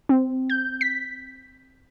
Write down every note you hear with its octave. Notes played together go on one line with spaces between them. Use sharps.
C4
G6
B6